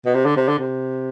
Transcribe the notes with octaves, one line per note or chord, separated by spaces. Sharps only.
B2
C3
D3
C3
D3
C3